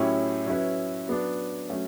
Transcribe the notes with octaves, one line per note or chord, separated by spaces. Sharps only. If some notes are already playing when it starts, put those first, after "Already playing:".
Already playing: A2 F#3 C#4 E4 G4
F#3 C#4 E4 B4
F#3 B3 D4
F#3 A3 C#4